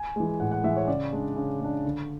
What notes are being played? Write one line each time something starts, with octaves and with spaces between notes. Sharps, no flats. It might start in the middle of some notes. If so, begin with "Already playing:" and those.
Already playing: G#5
E3 G#3
A2 F#5
F#5
E3 G#3 E5
C#5
C#3 D5
G#3 D4
C#3
G#3 D4
D3